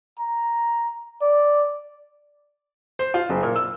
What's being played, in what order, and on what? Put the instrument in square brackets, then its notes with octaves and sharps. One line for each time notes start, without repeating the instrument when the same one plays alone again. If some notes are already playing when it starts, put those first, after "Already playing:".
[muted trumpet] A#5
D5
[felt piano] C5
F4
F#1
A#2
E6